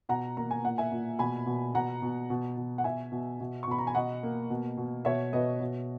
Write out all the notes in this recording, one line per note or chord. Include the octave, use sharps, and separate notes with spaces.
B2 F#5 A#5
A#3 A#5
G#5
A#2 F#5
E5 G#5
A#2
B2 G#5 B5
B2
B2 F#5 A#5
B2
B2
B2
F#5
B2 E5 G#5
B2
B2
C#6
B2 B5
A#5
G#5
B2 D#5 F#5
A#3
B2
B2
B2 C#5 E5
B2 B4 D#5
B2